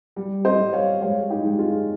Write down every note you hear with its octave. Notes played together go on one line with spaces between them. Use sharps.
G3
C5 D#5
G3
C#5 F5
G#3 C#5 F5
D#4 G4
G#3
F4 G#4